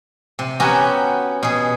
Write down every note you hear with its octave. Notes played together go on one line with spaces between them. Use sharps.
C3
B3 C#4 F#4 G4 G#5 A#5
B2 G#4